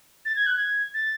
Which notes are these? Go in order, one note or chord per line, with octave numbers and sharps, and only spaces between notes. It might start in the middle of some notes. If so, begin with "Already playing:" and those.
A6
G#6
F#6
G#6
A6